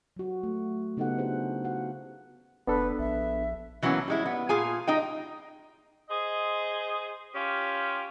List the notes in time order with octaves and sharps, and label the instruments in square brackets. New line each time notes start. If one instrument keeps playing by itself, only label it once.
[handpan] F#3 F#4
A3
C#3 B3 D#4 G4 A4 F#5
D4 E4 F#4 G#4 C5
F#4 F5 F#5
[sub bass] F1 [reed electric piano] B3 D4 A4 [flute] B4
[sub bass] A#1 [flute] E5
[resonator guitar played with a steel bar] E3 F#3 A#3 B3 C#4
G3 G#3 E4
B3
A#2 F4 G#4 G#5
G3 D#4 D#5 G5
[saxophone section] G#4 C5 D#5
C#4 F4 G4